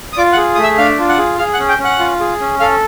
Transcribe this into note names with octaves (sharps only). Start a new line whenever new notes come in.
D#6
F4 D5 D6
F#5 F#6
G#4
A3 D#6
E5 E6
D4 F5 F6
F4
F#5 F#6
G#4
G#4 F5 F6
F#5 F#6
C#4
G5 G6
C#4
F#5 F#6
F4
G#4
C#4
A4 F5 F6